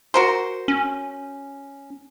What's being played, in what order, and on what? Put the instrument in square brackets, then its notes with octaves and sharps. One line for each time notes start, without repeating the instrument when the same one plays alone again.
[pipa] F#4 A#4 C5
[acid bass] C#4